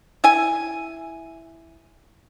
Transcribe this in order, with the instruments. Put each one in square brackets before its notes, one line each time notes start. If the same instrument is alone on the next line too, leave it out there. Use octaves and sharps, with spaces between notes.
[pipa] E4 G#5